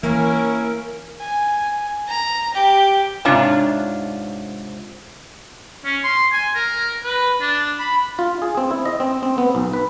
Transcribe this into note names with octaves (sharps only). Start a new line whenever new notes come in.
E3 A#3 C#4 E4 A#4
G#5
A#5
G4
G#2 C3 D4 F4 C#5 A5
C#4
C6
G#5
A#4
B4
D4
B5
F4
G#4
C4
E4
D#5
C4
C4
B3
B1
B4